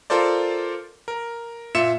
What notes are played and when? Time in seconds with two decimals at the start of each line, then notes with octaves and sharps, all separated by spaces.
0.10 F4 A4 A#4 C5 D5
1.08 A#4
1.75 A#2 F4 E5 C#7 E7